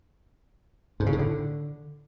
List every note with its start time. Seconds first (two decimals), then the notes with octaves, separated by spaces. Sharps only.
1.00 G#2
1.06 C#3
1.13 A2
1.19 D3